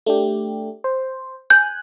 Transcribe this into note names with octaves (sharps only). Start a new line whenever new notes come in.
A3 D4 G4
C5
G#5 F#6 G6